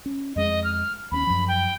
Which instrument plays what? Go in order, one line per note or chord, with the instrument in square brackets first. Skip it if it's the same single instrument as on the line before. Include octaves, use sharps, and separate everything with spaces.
[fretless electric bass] C#4
[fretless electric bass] F2 G#3 [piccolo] D#5
[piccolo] F6
[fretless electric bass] D#2 B3 C#4 [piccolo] B5
[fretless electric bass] F#2 F3
[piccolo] G5